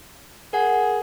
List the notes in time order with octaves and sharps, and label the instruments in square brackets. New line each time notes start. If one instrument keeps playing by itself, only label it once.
[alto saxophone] G#4 [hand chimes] A#4 F#5